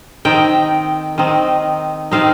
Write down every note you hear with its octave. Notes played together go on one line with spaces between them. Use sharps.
D#3 C4 D#4 G5
D#3 C4 D#4
D#3 C4 D#4 F5